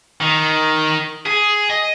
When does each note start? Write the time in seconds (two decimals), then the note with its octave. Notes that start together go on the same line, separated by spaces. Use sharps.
0.21 D#3
1.26 G#4
1.70 D#5